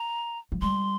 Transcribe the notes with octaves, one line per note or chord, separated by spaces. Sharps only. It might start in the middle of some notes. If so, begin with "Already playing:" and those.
Already playing: A#5
F3
G3 C6